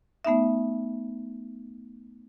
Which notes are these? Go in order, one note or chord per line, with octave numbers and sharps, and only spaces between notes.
A3 B3 D#4 E5